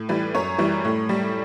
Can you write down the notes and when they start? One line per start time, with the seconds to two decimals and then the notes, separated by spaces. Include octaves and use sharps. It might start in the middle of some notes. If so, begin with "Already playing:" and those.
Already playing: A2
0.09 E3 G3 B4
0.34 F#2 C#5
0.58 E3 G3
0.85 A2
1.09 G3